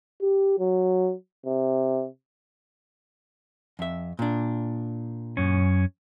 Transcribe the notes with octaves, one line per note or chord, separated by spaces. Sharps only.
G4
F#3
C3
F2 E5
A#2 D4
F#2 C#4